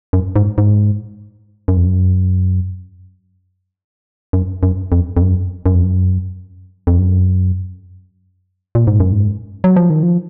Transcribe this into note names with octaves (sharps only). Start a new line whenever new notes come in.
F#2
G#2
G#2
F#2
F2
F#2
F#2
F#2
F2
F2
F#2
F#2
F2
F#2
F2
F#2
A#2
G#2
F#2
G#2
F#3
F3
D#3
F3